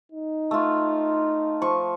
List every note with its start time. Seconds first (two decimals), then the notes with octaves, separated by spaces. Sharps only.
0.12 D#4
0.51 A3 F4
1.62 F3 C#6